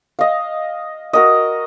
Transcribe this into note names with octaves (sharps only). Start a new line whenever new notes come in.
D#5 F5
F#4 A#4 D#5